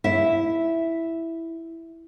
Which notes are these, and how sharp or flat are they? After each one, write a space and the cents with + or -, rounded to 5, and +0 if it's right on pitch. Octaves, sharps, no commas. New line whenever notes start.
E4 +0 E5 +0